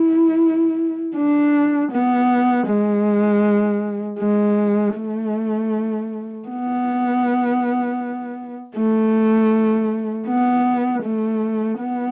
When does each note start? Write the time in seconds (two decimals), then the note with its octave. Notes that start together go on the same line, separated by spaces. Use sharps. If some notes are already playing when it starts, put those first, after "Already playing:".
Already playing: E4
1.15 D4
1.91 B3
2.67 G#3
4.19 G#3
4.96 A3
6.48 B3
8.75 A3
10.27 B3
11.03 A3
11.80 B3